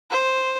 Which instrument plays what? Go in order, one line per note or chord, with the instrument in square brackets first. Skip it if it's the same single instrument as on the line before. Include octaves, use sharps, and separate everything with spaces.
[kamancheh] C5